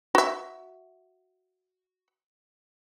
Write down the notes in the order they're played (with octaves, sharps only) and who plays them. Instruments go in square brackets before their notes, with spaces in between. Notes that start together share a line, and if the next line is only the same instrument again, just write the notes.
[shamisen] F#4 E5